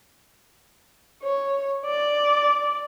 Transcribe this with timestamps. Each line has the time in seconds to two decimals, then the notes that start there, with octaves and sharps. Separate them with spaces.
1.23 C#5
1.85 D5